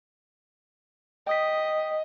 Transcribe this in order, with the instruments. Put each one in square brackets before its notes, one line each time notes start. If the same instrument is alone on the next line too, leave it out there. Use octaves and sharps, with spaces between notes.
[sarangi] D#5 [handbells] G5 D#6 B6